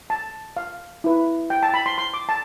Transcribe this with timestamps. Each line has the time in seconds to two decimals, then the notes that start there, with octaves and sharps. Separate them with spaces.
0.10 A5
0.57 F5
1.04 E4 B4
1.50 G5
1.63 A5
1.74 B5
1.86 C6
1.98 C6
2.14 D6
2.29 A5